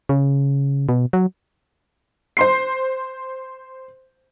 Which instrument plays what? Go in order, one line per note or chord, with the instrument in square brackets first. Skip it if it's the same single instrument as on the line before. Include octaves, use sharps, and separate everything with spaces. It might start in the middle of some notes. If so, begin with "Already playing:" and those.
[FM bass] C#3
B2
F#3
[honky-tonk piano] C5 C6 C7